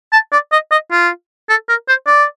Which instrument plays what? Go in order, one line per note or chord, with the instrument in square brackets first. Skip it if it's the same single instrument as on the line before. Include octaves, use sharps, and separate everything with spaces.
[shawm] A5
D5
D#5
D#5
F4
A4
A#4
C5
D5